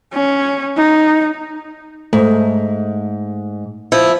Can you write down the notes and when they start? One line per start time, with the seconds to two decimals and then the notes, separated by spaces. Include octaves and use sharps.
0.13 C#4
0.76 D#4
2.13 G#2 A3
3.92 F3 E4